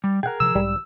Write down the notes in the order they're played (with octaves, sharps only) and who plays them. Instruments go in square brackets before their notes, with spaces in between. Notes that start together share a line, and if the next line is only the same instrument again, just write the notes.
[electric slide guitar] G3
[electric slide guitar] G#4 A#4 [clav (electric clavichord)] F#5 G5
[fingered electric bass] C3 F3 [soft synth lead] E6
[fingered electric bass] B1 G#2 [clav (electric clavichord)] G3